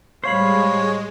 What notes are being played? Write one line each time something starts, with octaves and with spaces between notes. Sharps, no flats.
A2 G3 G#3 C5 C#5 F5 B5